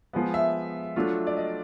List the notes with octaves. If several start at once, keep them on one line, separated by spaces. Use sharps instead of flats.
F3 G#3 B3
E5
F#3 A3 D4 F4
D5
D#5